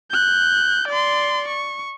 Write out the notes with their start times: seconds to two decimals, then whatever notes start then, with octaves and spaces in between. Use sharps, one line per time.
0.11 F#6 G6
0.88 D5 C6
1.48 C#6